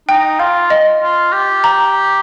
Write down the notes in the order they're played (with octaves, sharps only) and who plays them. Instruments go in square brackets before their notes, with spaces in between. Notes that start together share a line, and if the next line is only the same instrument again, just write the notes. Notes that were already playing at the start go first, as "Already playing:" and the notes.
[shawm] D#4 [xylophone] G5
[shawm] F4 [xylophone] F5
[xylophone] D#5
[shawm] F4
G4
[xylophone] A#5